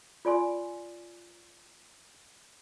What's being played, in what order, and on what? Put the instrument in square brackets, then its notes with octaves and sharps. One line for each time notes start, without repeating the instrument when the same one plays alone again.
[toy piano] F4 D5 G#5 C6